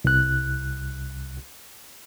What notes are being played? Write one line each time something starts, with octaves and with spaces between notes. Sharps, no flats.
C2 F#6